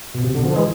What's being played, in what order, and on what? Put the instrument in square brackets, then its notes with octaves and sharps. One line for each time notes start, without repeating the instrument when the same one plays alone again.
[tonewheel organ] B2
C3
B2 D3
D3 F3
E3 G#3